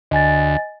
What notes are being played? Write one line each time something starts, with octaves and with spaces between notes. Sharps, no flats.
D2 D#5 G#5 A6